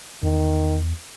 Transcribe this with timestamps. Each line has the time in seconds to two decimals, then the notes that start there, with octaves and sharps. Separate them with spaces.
0.23 E2 D#3